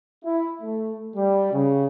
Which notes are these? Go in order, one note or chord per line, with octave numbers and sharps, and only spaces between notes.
E4
A3
G3
C#3